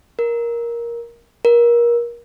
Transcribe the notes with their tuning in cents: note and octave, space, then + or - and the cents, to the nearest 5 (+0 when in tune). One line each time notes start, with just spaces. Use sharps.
A#4 +10
A#4 +25